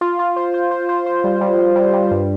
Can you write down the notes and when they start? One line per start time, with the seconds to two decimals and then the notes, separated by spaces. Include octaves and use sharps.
0.01 F4
0.19 F4
0.36 C5
0.54 C5
0.71 C5
0.89 C5
1.06 C5
1.24 G3
1.41 G3
1.58 G3
1.76 G3
1.93 G3
2.11 G2